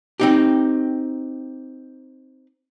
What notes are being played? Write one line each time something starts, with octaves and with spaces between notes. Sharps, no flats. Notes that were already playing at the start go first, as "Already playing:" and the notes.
C4 D#4 G4